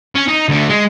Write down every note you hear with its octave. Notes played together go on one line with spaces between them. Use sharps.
C#4
D#4
D2 D3
G#3